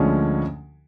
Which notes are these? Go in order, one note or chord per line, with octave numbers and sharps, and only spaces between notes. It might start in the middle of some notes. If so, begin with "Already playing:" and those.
Already playing: D2 D3 F3 G#3 C#4